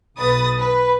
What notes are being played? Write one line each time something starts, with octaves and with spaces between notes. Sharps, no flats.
B1 B4 D#6 A6
B4